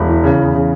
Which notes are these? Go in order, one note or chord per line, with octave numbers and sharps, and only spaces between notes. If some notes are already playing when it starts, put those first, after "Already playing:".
Already playing: E1 B5
E3
C#3
E2
C#3